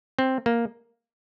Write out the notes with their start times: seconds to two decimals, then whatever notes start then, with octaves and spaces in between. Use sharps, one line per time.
0.19 C4
0.46 A#3